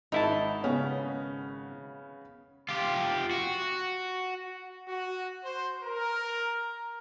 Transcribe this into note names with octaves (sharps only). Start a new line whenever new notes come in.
G#1 D#4 E4 A5
C#3 B3 C#4
F4 G4
F#4
F#4
C5
A#4